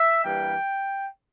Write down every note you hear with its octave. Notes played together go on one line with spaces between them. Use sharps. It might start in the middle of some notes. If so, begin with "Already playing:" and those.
Already playing: E5
G2 E3 G3 A#3 G5